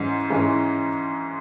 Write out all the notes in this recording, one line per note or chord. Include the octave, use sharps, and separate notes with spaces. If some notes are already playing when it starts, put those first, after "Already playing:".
Already playing: G#2 E3 G#3 C#4
G#2 E3 G#3 C#4